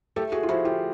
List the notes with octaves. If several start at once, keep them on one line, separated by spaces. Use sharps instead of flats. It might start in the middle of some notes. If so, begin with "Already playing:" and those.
A3 G4 A4
F#4 G#4
F4
F3 E4 F#4
F4 G4